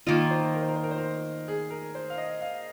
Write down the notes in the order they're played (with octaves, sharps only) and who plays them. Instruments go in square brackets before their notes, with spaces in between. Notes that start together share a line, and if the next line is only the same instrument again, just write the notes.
[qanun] D#3 A#3 F4 [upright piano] D#5
[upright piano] C5
A#4
C5
A#4
C5
A#4
C5
A#4
G#4
A#4
C5
F5
D#5
F5